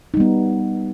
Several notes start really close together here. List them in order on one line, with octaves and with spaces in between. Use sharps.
D#4 G3 B3